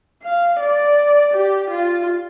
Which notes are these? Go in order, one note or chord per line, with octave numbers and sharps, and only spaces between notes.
F5
D5
G4
F4